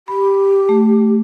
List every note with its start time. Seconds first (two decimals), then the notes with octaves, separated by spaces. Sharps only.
0.08 G4 B5
0.69 A3